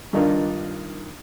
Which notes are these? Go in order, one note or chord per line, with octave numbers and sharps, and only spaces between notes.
G2 D#3 D4 D#4 F4 A#4